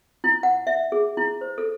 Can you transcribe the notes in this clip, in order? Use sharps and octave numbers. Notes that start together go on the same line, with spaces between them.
E4
F#5
E5
G#4
E4
C5
A4